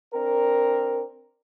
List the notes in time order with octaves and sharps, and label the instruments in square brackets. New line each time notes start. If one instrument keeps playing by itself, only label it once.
[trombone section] C4 D4 A#4